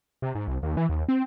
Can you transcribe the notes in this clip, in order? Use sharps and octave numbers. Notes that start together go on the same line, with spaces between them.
C3
G#2
C2
D#2
E3
D#2
C4